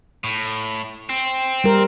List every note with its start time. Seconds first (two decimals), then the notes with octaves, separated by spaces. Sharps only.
0.24 A2
1.09 C4
1.64 G3 A#4